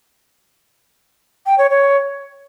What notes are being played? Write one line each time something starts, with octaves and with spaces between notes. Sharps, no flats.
G5
C#5
C#5